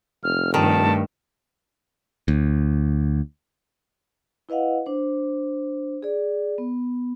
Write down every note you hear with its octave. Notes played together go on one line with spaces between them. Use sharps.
F1 F6
G2 D#3 A3 A5
D2
E4 B4 D#5 F5 F#5
D4 C5
G#4 D5
B3